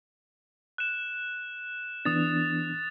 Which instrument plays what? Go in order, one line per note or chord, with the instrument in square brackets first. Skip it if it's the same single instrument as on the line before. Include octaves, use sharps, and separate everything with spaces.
[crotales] F#6 E7
[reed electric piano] E3 B3 D4 [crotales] D#6 A6